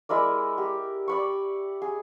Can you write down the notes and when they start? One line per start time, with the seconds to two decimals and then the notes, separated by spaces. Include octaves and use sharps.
0.09 G#3 E4 A#4 D5
0.58 G4
1.08 D5 B5 C#6
1.82 G#4